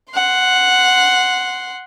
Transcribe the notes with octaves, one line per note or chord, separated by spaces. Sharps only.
F#5 C6